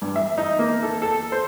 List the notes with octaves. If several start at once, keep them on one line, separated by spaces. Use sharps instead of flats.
G2
E5
D#4
A#3
A4
A4
C5